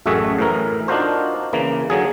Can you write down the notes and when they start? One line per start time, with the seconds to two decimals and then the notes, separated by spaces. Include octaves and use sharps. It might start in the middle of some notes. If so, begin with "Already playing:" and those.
0.06 A1 F#2 A3 F#4 G#4 E5
0.38 A2 E3 A#4
0.88 D4 D#4 F4 F#4 A#4 C5
1.53 C#3 E3 A#3
1.90 D3 F#3 G#4